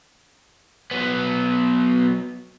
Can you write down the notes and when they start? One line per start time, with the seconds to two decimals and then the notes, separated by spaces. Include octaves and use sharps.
0.91 F#3 B3